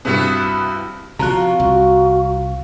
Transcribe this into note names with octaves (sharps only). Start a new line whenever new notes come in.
G2 C3 B3 E4 F#4
C3 D#3 F3 F4 F#4 A#5 F#6
C2 F#4